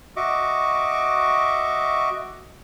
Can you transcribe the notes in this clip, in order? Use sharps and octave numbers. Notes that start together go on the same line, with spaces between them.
F#4 D#5 E5 C#6 D6